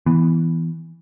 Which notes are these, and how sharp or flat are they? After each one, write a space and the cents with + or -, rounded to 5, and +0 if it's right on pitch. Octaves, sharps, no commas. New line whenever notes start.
E3 +0 B3 +0